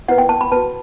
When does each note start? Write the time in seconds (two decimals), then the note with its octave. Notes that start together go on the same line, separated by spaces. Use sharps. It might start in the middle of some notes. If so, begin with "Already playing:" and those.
0.08 E4 B4 F#5
0.18 G5
0.29 A5
0.41 B5
0.52 F#4 B4 A5